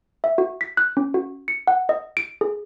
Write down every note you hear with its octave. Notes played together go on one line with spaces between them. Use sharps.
E5
F#4
B6
F#6
C#4
F#4
C#7
F#5
D#5
D7
G#4